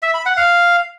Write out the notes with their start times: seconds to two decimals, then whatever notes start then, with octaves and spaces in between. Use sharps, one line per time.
0.02 E5
0.14 B5
0.26 F#5
0.37 F5